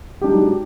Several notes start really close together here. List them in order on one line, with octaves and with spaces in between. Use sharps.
G4 D4 G#3 D#4 F#3